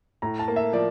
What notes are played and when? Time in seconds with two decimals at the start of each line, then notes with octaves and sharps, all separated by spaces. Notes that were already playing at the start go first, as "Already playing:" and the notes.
0.22 A2 A#5
0.39 A5
0.48 A#3
0.56 E5
0.73 F3 D5